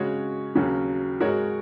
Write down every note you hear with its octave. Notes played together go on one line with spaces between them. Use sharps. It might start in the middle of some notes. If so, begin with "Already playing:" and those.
Already playing: C#3 G#3 F#4 C#5
D#2 C#3 F#3 C#4 F#4
G#2 G#3 F#4 A#4 C#5